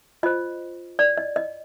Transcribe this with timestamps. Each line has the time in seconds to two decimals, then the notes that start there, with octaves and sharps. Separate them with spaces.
0.23 F4 C5 D#5
0.99 D5
1.17 D#5
1.36 D#5